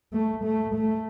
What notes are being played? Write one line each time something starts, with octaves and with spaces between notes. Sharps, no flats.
A3
A3
A3